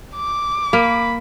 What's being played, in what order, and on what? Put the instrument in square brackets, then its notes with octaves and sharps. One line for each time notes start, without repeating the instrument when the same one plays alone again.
[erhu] D6
[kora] A#3 [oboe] B5